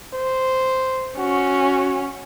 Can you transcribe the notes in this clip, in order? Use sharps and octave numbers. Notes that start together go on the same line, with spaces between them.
C5
C#4 F#4